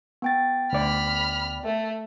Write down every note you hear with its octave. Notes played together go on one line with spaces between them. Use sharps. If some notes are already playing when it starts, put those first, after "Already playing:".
B3 G5 A6
D2 D5 B5 F6
A3